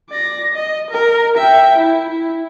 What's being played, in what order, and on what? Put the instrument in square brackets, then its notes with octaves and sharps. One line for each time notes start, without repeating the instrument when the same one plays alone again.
[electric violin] D5 A#6
D#5
A#4
E5 G5
E4
E4